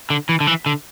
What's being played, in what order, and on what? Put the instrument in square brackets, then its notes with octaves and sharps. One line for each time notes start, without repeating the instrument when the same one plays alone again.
[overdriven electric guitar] D3
E3
D3
E3
D3